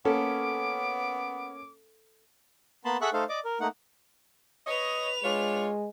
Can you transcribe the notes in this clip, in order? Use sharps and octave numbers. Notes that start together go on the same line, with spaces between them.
A#3 B3 C#4 A4 D6
A#3 B3 A5 B5 C6
G#4 A4 E5 F#5 C#6 F#6
A3 D#4 A4 C5 F5
D5 D#5 D6
A#4
A3 A#3 D#4 F#5
B4 C#5 D#5 F7
G#3 D4 F4 C#5